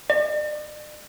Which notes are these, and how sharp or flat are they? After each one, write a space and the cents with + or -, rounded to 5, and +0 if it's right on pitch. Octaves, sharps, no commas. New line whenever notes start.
D5 +40